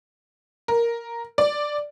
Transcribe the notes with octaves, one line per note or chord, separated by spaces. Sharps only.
A#4
D5